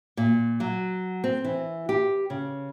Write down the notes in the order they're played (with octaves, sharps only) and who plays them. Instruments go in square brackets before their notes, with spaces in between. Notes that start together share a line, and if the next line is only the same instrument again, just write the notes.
[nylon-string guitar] A#2
F#3
C4
E3
G4
C#3